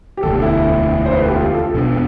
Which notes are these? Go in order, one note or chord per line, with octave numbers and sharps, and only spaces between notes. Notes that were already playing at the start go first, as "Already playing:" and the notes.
G4
E1 D2 D3 A4
E4
C5
B4
A4
G4
F4
A4
E2 B2 B3 D4